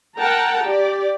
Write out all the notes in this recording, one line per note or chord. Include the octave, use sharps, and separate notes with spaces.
A#4 F#5 G5 A5 A#5
G4 D5